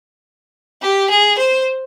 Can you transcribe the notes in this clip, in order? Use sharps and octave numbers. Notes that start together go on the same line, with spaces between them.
G4
G#4
C5